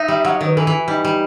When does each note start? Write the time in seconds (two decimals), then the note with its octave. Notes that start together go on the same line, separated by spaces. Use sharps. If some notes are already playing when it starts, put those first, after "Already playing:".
Already playing: D#4 E5
0.08 G3
0.25 F#3 F#5
0.36 D#3 D#5
0.46 B4
0.56 E3 A4
0.67 E3
0.72 E4
0.88 G3 D#4
1.04 G3